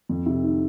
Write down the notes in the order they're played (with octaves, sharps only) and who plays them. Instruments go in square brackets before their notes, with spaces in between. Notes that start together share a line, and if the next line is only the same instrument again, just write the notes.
[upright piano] F2
C3
D#3